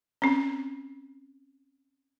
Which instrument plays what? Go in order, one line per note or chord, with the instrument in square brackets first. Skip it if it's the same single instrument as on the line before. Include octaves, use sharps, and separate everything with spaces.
[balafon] C4 C#4